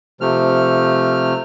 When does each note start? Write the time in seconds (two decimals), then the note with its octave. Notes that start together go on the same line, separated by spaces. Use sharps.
0.21 C3 F3 A3 F6